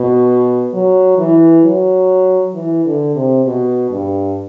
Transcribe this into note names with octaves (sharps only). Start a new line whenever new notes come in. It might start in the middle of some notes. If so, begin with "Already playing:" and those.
Already playing: B2
F#3
E3
F#3
E3
D3
C3
B2
G2